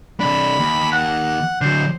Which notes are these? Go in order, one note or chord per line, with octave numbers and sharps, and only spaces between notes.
C3 D4 B5
D#2
F#5
D3 F#3 C5